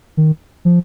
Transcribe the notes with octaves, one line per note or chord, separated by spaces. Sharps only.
D#3
F3